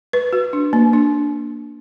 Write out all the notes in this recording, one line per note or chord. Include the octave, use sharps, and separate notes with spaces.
B4
F#4
D4
A#3
D4